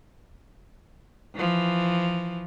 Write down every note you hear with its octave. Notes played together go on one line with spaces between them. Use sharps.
E3 F3